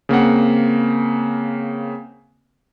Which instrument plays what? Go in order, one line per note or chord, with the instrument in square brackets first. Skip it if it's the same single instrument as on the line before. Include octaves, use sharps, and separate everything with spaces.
[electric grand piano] C#3 A#3 C4 F#5